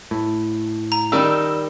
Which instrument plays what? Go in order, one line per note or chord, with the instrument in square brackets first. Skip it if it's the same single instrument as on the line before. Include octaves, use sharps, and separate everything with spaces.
[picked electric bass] A2
[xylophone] A#5
[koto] D#3 G3 D#4 [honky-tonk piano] E6